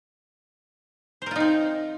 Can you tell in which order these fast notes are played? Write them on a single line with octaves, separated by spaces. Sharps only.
C5 A#4 F4 D#4 C4